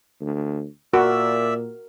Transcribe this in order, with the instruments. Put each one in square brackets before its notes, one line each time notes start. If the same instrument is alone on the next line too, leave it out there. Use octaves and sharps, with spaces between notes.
[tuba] D2
[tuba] A#2 [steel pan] F#4 [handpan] A#4 [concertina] D5 E5 E6